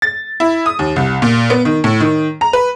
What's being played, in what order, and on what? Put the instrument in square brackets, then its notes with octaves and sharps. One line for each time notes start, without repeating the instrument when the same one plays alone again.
[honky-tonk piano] A6
E4
D#6
D#2
C2
A#2
B3
D#3
A2
D#3
A#5
B4